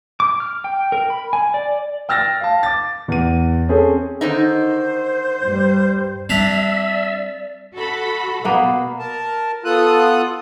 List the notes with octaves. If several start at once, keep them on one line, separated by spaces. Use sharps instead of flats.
D6
F6
G5
A#4
B5
G#5
D5
G5 E6 F6 A6 A#6
F5 A5
D6 A6
E2 D#7
C4 C#4 G#4 A4
D3 D#3 D#4 C5
G2 G3
G3 C4 D4 E4 D5 E5 A#5
F#4 A4 B5
B2 A#3 B3 F5
A#4 A5
B3 F4 A4 D#6 F#6